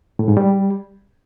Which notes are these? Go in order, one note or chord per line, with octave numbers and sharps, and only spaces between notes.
A2
G#2
G3